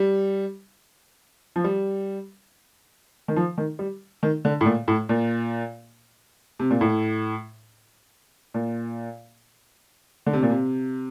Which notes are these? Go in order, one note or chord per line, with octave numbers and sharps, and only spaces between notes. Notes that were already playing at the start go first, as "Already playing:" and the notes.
Already playing: G3
F3
G3
D#3
F3
D#3
G3
D#3
D3
A2
A#2
A2
A#2
C3
A#2
A2
A#2
D3
C3
A#2
C3